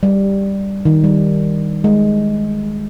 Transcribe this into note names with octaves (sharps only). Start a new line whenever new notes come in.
G3
D#3
G3
G#3